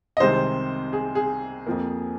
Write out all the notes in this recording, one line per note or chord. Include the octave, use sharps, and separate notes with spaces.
D#5
C2 C3 D#3 G#3 C5
G#4
G#4
F2 F3 A#3